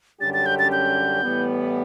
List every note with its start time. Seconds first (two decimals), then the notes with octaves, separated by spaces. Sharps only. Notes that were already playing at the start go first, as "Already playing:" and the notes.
0.21 F#2 D3 G3 C#4 G4 A6
0.34 A6
0.46 G6
0.59 A6
0.72 G6
1.23 A2 E3 G3 B3